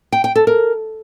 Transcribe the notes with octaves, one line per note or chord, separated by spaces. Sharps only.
G5
G5
A4
A#4